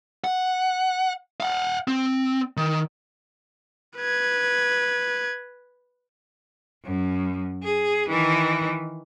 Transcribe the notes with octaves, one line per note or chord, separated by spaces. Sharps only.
F#5
F5 F#5
C4
D#3
B4 G#6
F#2
G#4
D#3 E3